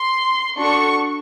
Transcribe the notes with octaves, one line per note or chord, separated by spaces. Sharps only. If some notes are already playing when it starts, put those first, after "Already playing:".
Already playing: C6
D4 F#4 A4 C#6